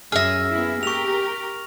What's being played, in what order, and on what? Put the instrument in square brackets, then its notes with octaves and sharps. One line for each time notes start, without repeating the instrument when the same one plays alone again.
[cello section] F#2 [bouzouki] G#4 E5 [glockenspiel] F6 A#6
[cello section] A#3 B3 E4
[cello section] G4 A#4 [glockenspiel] C#6 F7